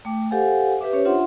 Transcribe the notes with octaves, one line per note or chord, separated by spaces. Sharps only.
A3 G5 D6
G4 A4 C5 F5 F#5 G#5
G4 B4 E5 D6
C#4 G4 C5 C#5
D4 F4 E5 F#5 C6